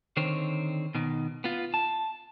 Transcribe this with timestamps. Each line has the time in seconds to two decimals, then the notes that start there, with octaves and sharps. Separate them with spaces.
0.17 D3 D#3 C4 C5 C#5
0.95 B2 D#3
1.44 B3 F4
1.74 A5